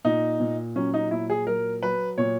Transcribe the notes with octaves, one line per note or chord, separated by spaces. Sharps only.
A#2 D#4
A#2
F#3 C#4
D#4
A#2 E4
G#4
F#3 A#4
F#3 B4
A#2 C#5